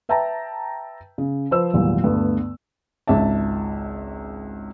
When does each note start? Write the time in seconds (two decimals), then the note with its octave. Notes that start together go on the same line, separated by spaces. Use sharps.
0.09 B4 E5 G5 A5 A#5
1.18 C#3
1.51 F3 B4 C5 E6
1.73 G#1 E2 A#2 F#3 G3
2.04 D2 G2 D3 A3 B3
3.07 G#1 C#2 E5 A5